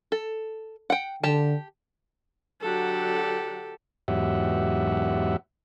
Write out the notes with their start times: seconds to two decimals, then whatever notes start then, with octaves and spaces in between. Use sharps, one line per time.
0.12 A4
0.90 F#5 G5
1.23 D3 G4 A5
2.61 D3 F#3 G4 A4 F#5
4.08 E2 G#2 F#3 G4 E5 F#5